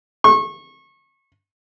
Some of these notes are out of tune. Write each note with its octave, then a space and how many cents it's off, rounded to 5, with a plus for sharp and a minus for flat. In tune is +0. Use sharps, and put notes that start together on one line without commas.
C#6 -30